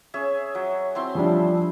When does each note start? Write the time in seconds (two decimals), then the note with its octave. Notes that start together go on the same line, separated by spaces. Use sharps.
0.14 C#4 G#4 E5
0.55 F#3
0.95 C4 E4 C6
1.15 F3 G3 D4